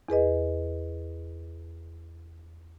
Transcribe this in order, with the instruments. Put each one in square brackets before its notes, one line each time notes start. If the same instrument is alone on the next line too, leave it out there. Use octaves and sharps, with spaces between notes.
[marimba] E2 G#4 B4 D#5